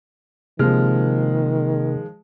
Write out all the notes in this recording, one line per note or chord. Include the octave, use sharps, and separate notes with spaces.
C3 D#3 F3 G#3 A#3 F6